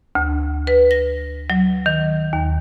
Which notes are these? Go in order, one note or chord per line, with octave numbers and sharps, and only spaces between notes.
D2
B4
A#6
F#3
D#3
D#2